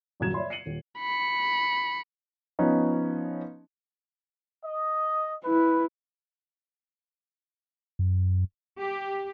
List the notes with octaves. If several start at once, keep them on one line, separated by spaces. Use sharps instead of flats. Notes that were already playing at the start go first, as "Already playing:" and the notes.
D#1 F#2 C#3 F#3 G#6 E7
C#5 D5 E5 B5 C6
C7 C#7 D#7 F#7
D#1
B5 C#7
F3 B3 C#4 D#4
D#5
E4 B4
F#2
G4